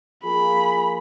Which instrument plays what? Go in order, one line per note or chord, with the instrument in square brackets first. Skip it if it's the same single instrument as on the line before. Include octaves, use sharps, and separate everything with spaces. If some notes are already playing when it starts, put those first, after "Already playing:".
[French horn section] F3 A#3 F4 G#4 [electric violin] B5